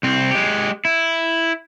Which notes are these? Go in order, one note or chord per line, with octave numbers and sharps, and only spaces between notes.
C2 C4
G#3 G4
E4